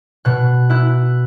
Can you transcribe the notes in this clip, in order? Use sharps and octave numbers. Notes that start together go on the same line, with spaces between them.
B2 F#6
E4 F#6